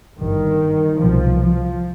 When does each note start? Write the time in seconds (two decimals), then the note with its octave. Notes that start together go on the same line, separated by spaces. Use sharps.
0.17 G1 G2 D#3
0.98 C2 B2 F3
1.39 F3